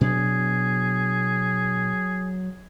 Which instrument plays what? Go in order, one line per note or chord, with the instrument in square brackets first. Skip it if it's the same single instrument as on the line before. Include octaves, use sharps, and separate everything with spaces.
[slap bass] B2 D4 [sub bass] F#3 [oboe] G#4